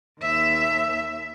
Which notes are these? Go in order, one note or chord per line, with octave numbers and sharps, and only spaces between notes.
D#2 E5